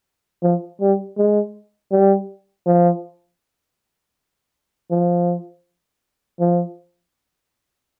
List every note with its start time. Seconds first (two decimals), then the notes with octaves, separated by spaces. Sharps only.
0.43 F3
0.81 G3
1.18 G#3
1.92 G3
2.67 F3
4.91 F3
6.40 F3